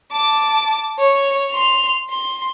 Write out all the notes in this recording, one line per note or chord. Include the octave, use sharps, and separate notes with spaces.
A5 D6
C#5
C6 F7
C6